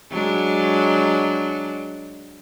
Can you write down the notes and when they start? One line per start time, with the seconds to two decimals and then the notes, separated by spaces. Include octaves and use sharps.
0.11 F#3 G#3 D4